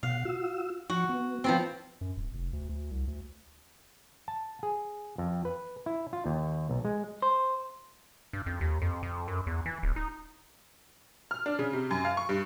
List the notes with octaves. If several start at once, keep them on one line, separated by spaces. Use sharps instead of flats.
B2 F5 F#5
F4 F#4 E6
F3 F#4 C#6
B3
F3 B3 C4 C6
F#2
D1
F1
D2
D2
C2
D2
A5
G#4
F2
B4
E4
F4
D#2
B1
G#3
C5
G2
F2
D#2
F2
F2
F#2
E2
E3
D1
D#4
F6
D4
C#3
C3
F#2
F5
C#6
G2